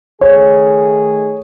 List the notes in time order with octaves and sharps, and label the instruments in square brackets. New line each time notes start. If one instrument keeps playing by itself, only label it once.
[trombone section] D#3 A3 G#4 [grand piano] C#5